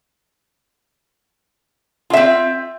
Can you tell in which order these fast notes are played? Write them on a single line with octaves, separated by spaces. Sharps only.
F4 E5 C4